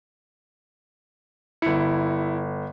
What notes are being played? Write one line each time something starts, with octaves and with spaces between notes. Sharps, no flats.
G1 E4 C#7